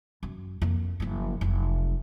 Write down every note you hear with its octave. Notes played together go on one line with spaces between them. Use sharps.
F#2
F2 A#3
F#1 F3
F1 F#3